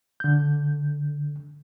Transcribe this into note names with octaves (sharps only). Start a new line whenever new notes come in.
D3 G6